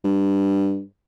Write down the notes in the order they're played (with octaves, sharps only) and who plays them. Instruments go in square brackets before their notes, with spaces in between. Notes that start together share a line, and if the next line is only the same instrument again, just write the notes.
[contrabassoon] G2